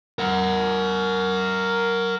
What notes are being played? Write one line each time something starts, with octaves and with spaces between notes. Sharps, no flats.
A#4 F#5